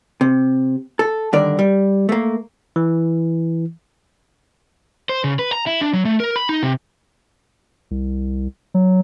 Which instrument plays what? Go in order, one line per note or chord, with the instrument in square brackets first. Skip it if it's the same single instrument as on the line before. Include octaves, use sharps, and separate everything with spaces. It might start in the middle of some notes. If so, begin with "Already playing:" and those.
[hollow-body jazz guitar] C3
A4
G2 D3 D#3 A#4 D5
G3
A3 A#3
[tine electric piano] E3
[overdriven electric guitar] C5
C#3
B4
A#5
E4
D4
F#3
A3
A#4
B5
D#4
C3
[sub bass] C2
F#3